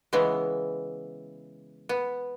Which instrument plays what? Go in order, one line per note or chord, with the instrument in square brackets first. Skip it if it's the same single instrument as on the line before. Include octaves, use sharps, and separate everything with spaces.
[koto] C#3 E3 G#3 B3
B3